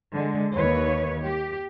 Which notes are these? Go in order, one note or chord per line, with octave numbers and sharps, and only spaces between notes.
D3 G#3
D#2 B4 C#5
G4